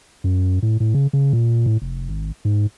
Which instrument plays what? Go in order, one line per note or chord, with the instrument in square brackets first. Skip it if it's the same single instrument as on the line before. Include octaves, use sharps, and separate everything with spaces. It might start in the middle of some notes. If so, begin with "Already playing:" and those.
[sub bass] F#2
A2
A2
C#3
C#3
A#2
A2
F1
G#1
G#2